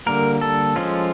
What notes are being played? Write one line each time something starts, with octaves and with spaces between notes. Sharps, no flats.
D3 G3 A#3 A#4
A4
F3 G#3 C#4 F4